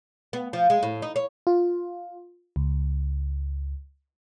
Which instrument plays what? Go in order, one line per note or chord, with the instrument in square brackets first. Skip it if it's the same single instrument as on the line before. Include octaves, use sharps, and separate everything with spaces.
[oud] B3
F3
G#3
A2
D#4
C#5
[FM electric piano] F4
C#2